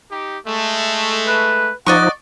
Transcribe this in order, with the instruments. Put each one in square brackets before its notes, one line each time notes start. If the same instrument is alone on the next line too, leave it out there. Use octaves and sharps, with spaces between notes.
[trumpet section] D#4 G4
G#3 A3
[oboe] B4
[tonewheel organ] F3 D#4 [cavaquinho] D5 D#5 C#6 [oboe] F#5